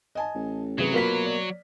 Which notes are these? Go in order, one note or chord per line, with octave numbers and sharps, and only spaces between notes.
D#5 G#5 A5
A1
C3 F#3 G#4 B4
B2 A#3 F4 B4 B5 B6
D5